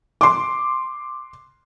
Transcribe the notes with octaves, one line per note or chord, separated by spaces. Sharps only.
C6 D6